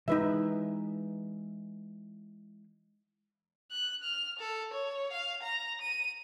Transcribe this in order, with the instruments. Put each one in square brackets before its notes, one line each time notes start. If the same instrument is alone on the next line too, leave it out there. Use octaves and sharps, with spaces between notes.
[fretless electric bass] E3 G#3 [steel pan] D#4 B4 E5
[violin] F#6
F6
A4
C#5
F5
A#5
D#7